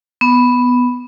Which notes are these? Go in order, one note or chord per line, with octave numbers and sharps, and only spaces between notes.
B3